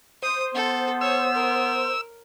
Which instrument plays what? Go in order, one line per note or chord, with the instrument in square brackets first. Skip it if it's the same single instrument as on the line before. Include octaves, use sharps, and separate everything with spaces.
[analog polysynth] C5 [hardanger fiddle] D#6
[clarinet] B3 [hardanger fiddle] A4
[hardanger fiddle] C#5 [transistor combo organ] E6
[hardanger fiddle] A#4